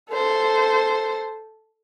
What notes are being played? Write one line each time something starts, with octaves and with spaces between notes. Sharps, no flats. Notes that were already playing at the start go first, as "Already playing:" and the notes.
A4 C5